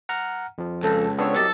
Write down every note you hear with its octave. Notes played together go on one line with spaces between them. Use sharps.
F#5 A#5 F6
F2 F3
C#2 A4
B3 C4 D4 A4 C#5
C2 F#3 G4 A4 D#5